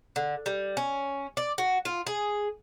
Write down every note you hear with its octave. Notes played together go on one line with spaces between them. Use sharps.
D3
G3
C#4
D5
F#4
F4
G#4